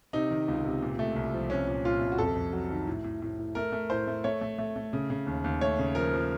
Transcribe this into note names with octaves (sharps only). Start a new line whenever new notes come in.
C3 D#4
D#3
C#2
C3
A#2
A3
C2
F3
C2 C#4
A#2
A#2 F4
C2
F#4
F2 A4
F2
F#3
D#3
A2
A2
A2
A2
A3 A#4
A3
A2 C5
A3
A3 C#5
A3
A3
A3
C#3
C#3
D#2
D#2
A3 C#5
C#3
F3 A#4
F3